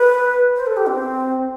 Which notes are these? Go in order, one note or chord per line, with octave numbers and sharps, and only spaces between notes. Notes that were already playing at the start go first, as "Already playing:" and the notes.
Already playing: B4
C5
A4
G4
C4